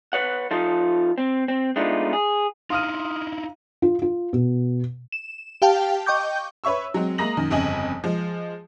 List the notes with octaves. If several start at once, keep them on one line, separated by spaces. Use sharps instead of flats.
B4 C#5 F#5
F3 D#4 F4 A4
C4
C4
G#3 A3 B3 D4 D#4 F4
G#4
D#4 E4 F5 C6 D#6 F6 D#7
F4
F4
B2
E7
G4 F5 G5 A5
D#5 G5 C#6 D6 G6
B4 C#5 E5 C#6 E6
F#3 G#3 C4
G#3 A#3 A#5 D#6 A#6 F#7
F#2 D#3
G1 F2 C#3 D#5 G#5 F#7
F3 G#3